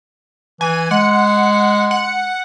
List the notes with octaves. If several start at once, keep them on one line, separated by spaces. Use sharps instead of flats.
E3 G#5
G#3 F#5
F#5